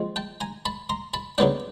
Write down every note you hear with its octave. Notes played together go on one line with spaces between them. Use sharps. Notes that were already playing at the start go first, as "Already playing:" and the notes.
Already playing: F3 G#3 C4
G5 A5
G#5 A#5
A5 B5
A#5 C6
A5 B5
C#3 F#3 B3 D4 G5 A5